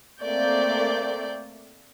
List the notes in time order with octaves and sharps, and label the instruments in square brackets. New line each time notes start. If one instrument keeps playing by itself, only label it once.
[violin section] A3 A#3 C4 D5 G6